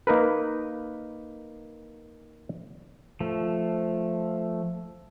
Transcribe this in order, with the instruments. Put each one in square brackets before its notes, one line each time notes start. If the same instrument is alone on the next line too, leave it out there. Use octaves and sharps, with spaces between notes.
[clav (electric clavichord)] A#3 D#4 A#4 B4
[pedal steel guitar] F3 A3